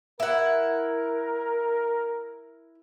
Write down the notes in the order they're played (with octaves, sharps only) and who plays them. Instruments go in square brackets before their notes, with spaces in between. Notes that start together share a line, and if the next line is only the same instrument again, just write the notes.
[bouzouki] E4 F#5 [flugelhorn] A#4